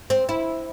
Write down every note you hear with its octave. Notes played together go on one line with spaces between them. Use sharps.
C4
E4